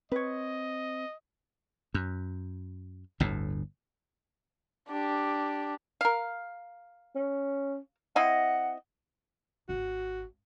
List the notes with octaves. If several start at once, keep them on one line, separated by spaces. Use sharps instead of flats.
C4 B4 C#5 D#5
F#2
G1 D2 A2
D4 G4
A#4 F5
C#4
C4 E4 D#5 F#5
G#1 F#4